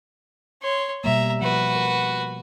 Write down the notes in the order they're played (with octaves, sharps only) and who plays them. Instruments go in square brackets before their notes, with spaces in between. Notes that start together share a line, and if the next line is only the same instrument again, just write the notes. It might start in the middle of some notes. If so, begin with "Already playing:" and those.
[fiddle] C#5 C6
[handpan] B2 G3 A#3 [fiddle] E5 A#5
[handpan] F3 [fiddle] F#4 B4
[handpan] A#4